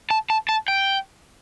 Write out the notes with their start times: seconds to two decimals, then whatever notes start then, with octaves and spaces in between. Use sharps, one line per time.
0.11 A5
0.30 A5
0.49 A5
0.68 G5